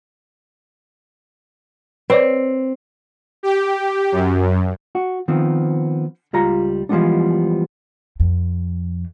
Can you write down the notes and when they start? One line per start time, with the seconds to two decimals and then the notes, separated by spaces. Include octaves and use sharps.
2.10 C4 B4 C#5 D5
3.43 G4
4.12 F#2
4.95 F#4
5.28 D#3 F3 B3 C4
6.33 C#2 G3 F4 A#5
6.89 E3 F3 G3 G#3 B3 D4
8.20 F2